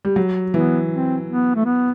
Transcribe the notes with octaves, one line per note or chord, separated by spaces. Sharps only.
G3
F#3
E3 B3
C4
B3
A3
B3